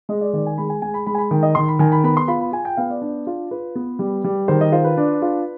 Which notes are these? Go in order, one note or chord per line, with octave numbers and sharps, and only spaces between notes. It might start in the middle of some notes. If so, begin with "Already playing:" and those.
G#3 D#5
D5
D#3 D5
G#5
G#3 B5
G#5
G#3 G#5
B5
G#3 B5
G#5
B5
D#3 G5
D#5
D#3 C6
B5
D#3 G#5
B5
B3 B5
C6
F4 B5
B5
F4 G#5
G5
B3 F5
D5
D4
F4
F4 B4
B3
G3
G3
D#3 C5
D#5
F4 C5
B4
D4
F4